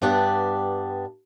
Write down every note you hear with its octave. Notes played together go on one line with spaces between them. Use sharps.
G2 G3 B3 D4